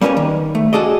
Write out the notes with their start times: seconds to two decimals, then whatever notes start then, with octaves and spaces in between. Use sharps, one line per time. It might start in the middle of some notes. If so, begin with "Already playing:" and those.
0.01 G3 A#3 C#4 A#4 B4 C#5
0.17 D#3
0.55 A3
0.73 F#4 G#4 A4 D5 D#5